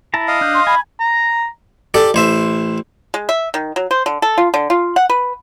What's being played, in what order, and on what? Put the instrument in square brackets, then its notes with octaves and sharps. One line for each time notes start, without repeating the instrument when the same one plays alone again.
[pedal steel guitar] E4 A5 A#5
[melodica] D#5 F5
[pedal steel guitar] D4 F#6 G6
[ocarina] C6
[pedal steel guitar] G#5 [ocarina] B5
[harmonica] A#5
[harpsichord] G4 A4 D5
A1 C5 E5
[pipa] G#3
E5
D#3
F#3
C5
D3
A4
F4
D3
F4
F#5
B4